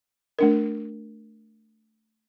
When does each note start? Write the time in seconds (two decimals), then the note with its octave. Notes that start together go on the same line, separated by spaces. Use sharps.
0.39 A3 D4 A#4